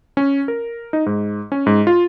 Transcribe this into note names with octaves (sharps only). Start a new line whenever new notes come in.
C#4
A#4
D#4
G#2
C#4
G#2
F4